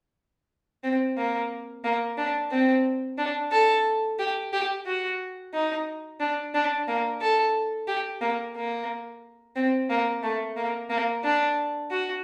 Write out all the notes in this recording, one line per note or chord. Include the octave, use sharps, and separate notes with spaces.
C4
A#3
A#3
D4
C4
D4
A4
G4
G4
F#4
D#4
D4
D4
A#3
A4
G4
A#3
A#3
C4
A#3
A3
A#3
A#3
D4
F#4